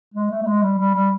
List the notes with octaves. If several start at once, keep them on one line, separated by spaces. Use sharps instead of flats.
G#3
A3
A3
G#3
G3
G3
G3